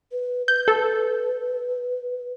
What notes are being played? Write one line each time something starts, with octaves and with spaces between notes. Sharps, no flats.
B4
B4 G6
A4